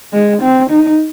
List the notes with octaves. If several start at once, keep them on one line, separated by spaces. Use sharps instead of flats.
G#3
C4
D#4